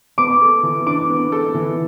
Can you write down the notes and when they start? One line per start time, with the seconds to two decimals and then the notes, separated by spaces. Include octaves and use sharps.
0.18 B3 D6
0.41 A4
0.63 E3
0.87 D4 D6
1.09 B3
1.32 A4
1.54 E3